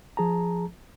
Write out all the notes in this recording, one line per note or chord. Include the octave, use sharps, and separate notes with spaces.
F3 G#4 A5 A#5